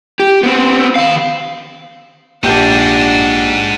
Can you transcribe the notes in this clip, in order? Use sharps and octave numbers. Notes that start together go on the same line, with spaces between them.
G4
B3 C4
D#3 F5
A#1 G#3 D4 D#4 G4 F#5 G6